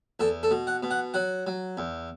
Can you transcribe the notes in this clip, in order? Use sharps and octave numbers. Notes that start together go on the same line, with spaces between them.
E2 A4
A4
B2
F#5
B2
F#5
F#3 F#5
F#3
E2